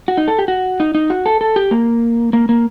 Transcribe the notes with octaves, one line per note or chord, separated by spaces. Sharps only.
F#4
D#4
A4
G4
F#4
D#4
D#4
F#4
A4
A4
G4
A#3
A#3
A#3